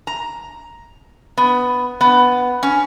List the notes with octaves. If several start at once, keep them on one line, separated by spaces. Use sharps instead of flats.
A#5
B3
B3
C#4